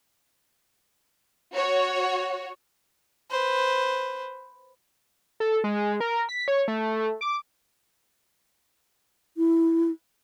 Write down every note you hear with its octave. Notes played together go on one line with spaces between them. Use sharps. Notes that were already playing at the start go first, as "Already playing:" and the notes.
F#4 C#5
B4 C5
A4
G#3
A#4
B6
C#5
A3
D6
E4